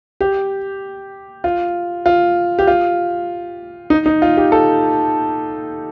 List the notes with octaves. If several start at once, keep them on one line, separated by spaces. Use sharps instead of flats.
G4
F4
F4
G4
F4
D#4
D#4
F4
G4
A4